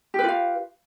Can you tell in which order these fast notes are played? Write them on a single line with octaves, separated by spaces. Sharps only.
G4 B4 F4 F5